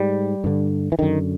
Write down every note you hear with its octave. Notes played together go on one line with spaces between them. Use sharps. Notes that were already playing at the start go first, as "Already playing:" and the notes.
Already playing: G#2 G3
G2 D3
E3
F#2 D3 D#3